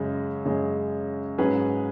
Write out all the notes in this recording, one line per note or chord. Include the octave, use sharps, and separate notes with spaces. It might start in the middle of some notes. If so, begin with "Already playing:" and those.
Already playing: F#2 C#3 G#3
F#2 C#3 G#3
G#2 F#3 C#4 G#4 B4